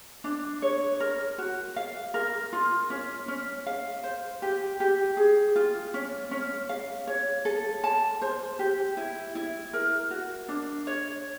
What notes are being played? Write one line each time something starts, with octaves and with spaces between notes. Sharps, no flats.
D4
C#5
A#4
F#4
F5
A#4
F4
C#4
C#4
F5
C5
G4
G4
G#4
F4
C#4
C#4
F5
C#5
A4
A5
C5
G4
E4
E4
A#4
F#4
D4
C#5